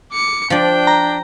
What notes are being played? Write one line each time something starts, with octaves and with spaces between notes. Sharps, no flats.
D6 C#7
F3 D4 D5 G5
A#5